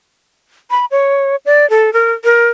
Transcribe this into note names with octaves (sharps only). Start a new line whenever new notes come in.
B5
C#5
D5
A4
A#4
A#4